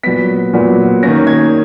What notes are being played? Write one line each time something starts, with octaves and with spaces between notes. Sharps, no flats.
A#2 F#3 B3 B6
A#2 F#3 B3
D#3 A#3 C#4 A#6
G#6